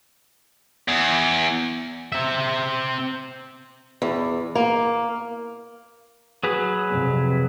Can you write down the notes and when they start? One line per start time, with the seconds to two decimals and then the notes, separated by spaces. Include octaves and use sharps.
0.88 E2
2.12 C4 E5
4.02 E2
4.55 A#3
6.43 F#3 G#4 B4
6.89 F2 C3